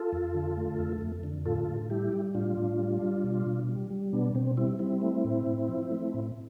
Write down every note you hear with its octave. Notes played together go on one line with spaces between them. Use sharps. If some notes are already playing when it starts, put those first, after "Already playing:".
Already playing: F4 A4
F2
D3
A3
F2
F2
D3
A2 F4 A4
A2
G3 E4 G4
G3
A2 D4 F4
A2
G3
G3
B2
B2
G3
G3
B2 B3 D4
B2 C4
G3 C4 E4
G3 C4 E4
A3
A2
A2
F3
A3
A2